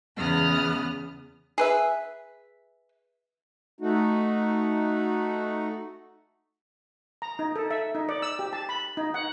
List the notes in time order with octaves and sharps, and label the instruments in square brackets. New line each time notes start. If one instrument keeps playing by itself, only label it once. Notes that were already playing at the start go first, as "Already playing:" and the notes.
[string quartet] E2 C#3 B3 D#6 F6 F#6
[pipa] G#4 B4 E5
[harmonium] A3 D#4 F#4
[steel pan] A#5
D#4
A4
E5
D#4
D5
E6
G4
A5
B5
D#4
F#5